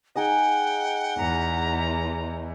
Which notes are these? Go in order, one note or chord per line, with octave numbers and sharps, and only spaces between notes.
D#4 G#4 D#5 F#5 G5
E2 A#5